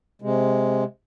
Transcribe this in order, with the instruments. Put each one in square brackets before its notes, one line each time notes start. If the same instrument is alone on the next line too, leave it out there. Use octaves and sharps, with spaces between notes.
[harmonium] C3 G#3